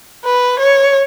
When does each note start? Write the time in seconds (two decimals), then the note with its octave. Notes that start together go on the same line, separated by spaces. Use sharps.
0.25 B4
0.60 C#5